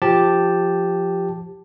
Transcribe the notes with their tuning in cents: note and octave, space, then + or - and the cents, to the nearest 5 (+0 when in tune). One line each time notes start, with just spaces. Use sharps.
F3 +0 G4 +0 A5 +0